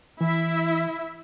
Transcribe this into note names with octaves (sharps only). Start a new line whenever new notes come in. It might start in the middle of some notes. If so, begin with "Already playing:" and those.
E3 E4 E5